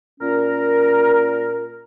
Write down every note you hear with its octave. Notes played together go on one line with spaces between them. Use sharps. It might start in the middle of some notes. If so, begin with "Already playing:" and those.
A#2 C#4 A#4